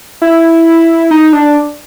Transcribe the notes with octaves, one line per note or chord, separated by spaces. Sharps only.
E4
D#4
D4